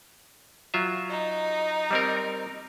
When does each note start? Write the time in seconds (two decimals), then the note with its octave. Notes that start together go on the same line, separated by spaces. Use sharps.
0.74 F#3 F4 E5
1.10 D#4
1.91 G3 C4 A#4